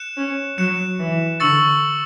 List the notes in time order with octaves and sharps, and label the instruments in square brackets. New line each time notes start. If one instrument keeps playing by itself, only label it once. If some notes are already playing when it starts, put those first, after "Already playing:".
Already playing: [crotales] F#6 C#7 E7
[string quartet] C#4
[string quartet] F#3 [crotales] F#6 C#7 E7
[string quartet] E3
[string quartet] D3 [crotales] C#6 E6 A6 C#7 F#7